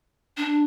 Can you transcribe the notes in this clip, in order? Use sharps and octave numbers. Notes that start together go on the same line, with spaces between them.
D4